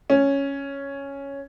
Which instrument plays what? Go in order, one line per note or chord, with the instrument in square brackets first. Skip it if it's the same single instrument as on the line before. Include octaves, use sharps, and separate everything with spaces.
[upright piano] C#4